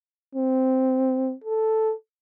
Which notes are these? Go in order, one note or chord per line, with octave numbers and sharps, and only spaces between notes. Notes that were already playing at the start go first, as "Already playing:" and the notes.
C4
A4